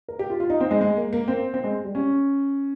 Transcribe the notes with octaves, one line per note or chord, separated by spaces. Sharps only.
A#4
G4
F4
F4
D#4
C4
G#3
G#3
A#3
A#3
C4
C4
G#3
G3
C#4